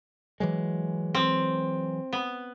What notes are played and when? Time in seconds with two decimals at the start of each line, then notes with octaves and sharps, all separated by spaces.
0.40 E3 F#3 G#3
1.15 C4
2.13 B3